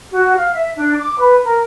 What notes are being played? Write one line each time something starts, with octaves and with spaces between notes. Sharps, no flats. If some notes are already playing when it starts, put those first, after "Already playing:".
F#4
F5
E5
D4
D6
B4
A#4